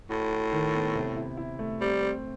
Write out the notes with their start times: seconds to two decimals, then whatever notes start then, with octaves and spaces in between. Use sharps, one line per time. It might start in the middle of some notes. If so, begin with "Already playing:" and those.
0.09 A2 F#4
0.31 F#4
0.52 D#3
0.74 B3
0.95 C3
1.17 E4
1.37 E4
1.59 A3
1.81 G3 C4
2.02 C4